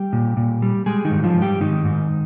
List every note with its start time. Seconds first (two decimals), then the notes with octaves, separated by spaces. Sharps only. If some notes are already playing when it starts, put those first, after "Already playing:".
Already playing: G3 G4
0.13 A#2
0.37 A#2
0.62 G3
0.86 G3 G#3 G#4
1.05 D#3 D#4
1.11 G#2
1.24 F3 F4
1.36 G#2
1.42 G3 G4
1.60 G#2 D#3 D#4
1.85 G#2